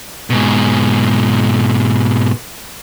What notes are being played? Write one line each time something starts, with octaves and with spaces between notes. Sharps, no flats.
G#2 B2